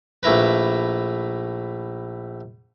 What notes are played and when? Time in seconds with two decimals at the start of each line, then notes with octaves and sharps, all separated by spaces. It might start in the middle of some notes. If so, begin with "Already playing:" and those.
0.23 A#1 A3 E4 A#4 B4